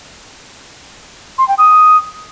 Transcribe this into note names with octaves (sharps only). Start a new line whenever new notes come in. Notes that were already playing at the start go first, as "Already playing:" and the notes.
C6
G5
D#6